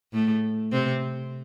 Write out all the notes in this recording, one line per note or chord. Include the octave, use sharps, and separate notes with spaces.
A2 A3
C3 C4